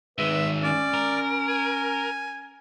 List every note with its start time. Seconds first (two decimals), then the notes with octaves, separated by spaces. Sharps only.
0.18 D#3 G#3 B4 E5
0.63 C#4 D5
0.94 A#4
1.48 G#5